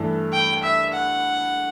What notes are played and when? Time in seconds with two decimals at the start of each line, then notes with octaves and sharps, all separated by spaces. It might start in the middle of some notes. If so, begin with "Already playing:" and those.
Already playing: G2 E3 A3 E4 A4
0.32 G5
0.63 E5
0.93 F#5